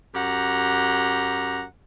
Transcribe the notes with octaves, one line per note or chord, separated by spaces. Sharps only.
F#2 G4 F#5 A#5